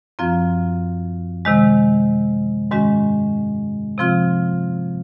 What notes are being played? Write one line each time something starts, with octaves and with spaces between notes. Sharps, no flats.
F#2 F3 C4 F4
C3 D#3 G#3
G#2 D#3 G#3 C#4 F#4
C3 F3 C4 F4